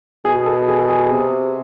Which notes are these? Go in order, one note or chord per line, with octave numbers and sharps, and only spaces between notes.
B2 G#4
A4
G#4
A4
G#4
C3